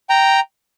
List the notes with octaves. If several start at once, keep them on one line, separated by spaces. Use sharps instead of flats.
G5 A#5